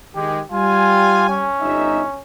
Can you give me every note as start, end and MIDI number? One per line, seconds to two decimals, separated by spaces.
0.16 0.40 51
0.16 0.40 56
0.16 0.43 67
0.52 1.47 55
0.52 1.26 65
0.52 1.47 67
0.52 1.47 80
1.29 2.22 61
1.61 2.02 31
1.61 2.02 63
1.61 2.02 76